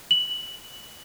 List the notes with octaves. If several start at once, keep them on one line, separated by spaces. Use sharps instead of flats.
F#7